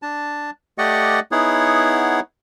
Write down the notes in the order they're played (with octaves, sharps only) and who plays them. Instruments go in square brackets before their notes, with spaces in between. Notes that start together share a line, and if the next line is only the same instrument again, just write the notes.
[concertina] D4 A5
A3 G4 D5 D#5 F#5 C#6
B3 D#4 E4 G#4 C#5 F#5